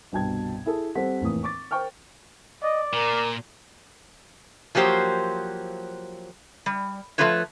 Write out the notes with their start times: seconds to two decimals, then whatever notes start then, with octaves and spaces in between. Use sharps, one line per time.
0.12 G1 C2 B2 G5 A5 G#6
0.66 E4 G#4 A4
0.95 G3 C4 A4 C5 F#5 B6
1.20 F1 A2 E3 A#3 D#6
1.43 C#6 D6 A6
1.71 A#4 C5 G5 C#6 F6
2.63 D5 D#5
2.93 A#2 A#4
4.75 F3 F#3 A#3 G4 C5
6.66 G3
7.18 F3 A3 B3 F4 B4 C#5